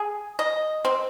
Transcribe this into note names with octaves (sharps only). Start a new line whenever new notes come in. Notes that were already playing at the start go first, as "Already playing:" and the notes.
Already playing: G#4
D#5
C4